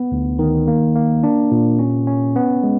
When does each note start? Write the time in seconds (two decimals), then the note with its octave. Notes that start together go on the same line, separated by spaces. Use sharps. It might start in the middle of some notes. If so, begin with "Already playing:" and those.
Already playing: B3
0.12 D2
0.39 D#3
0.68 A#3
0.96 A#3
1.23 D4
1.51 A#2
1.79 C#4
2.07 C#4
2.36 B3
2.63 G#3